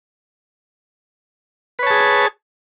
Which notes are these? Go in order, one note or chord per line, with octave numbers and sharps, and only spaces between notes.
G#4 B4 C#5 A5